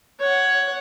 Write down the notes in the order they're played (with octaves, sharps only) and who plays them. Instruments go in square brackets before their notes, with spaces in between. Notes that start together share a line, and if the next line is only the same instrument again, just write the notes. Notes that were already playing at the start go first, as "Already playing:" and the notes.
[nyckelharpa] C#5 F#5